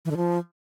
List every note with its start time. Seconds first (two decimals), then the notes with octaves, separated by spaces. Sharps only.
0.05 E3
0.11 D3
0.17 F3